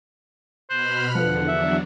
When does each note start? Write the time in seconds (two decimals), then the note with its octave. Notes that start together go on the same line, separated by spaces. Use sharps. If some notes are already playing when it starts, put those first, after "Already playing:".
0.70 B2 C5 B5 F6 F#6
1.15 E2 D3 F3 B3 F#5
1.48 E2 F#3 D4 E5